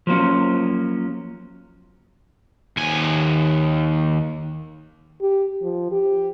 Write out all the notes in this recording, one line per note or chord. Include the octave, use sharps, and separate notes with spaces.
F3 F#3 A#3 C#4
D#2 G#5
G4
F3
G4